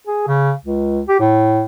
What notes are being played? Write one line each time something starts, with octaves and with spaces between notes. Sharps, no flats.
G#4
C#3
C#2
G4
A2